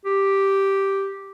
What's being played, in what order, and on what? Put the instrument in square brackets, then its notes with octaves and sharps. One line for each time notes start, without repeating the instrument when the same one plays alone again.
[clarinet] G4